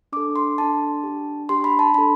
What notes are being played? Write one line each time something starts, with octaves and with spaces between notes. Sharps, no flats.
D4 A4 D6
C6
D4 A4 A5
D4 G4
D4 G4 C6
B5
A5
D4 A4 B5